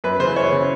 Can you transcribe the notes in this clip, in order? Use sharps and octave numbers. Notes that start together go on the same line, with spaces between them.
F#2 B4
C#3 E3 C5
F#2 C#5
C#3 E3